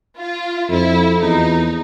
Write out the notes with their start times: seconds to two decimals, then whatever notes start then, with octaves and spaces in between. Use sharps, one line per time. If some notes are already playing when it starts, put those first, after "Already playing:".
0.18 F4
0.70 F2 E4
1.22 E2 D#4